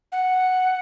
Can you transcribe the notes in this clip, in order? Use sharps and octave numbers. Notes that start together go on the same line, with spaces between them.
F#5